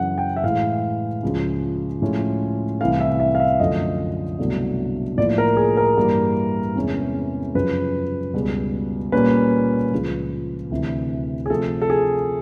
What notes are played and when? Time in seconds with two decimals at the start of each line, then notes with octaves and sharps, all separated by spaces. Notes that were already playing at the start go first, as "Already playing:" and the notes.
Already playing: F#2 C#3 E3 F#5
0.18 G5
0.36 E5
0.44 A2 E3 G#3 F5
1.23 C#2 C#3 F3
2.02 A2 F3 G#3 C#4
2.80 C2 C3 E3 A3 F5
3.00 E5
3.20 E5
3.35 F5
3.40 E5
3.60 F#2 D3 F3 A3 D#5
4.39 C2 B2 F#3 A3 D4
5.17 A2 F3 A#3 D5
5.38 A#4
5.57 G#4
5.77 A#4
5.97 G2 E3 G3 A#3
6.76 E2 C3 E3 G#3 C#4
7.55 F#2 C#3 F3 B4
8.33 C#2 B2 G3
9.12 A#2 G3 A#3 C#4 B4
9.92 C#2 C#3 F3
10.71 D2 C3 E3
11.46 G#4
11.50 C3 F3 A3 C4 A4
11.82 A4
11.90 G#4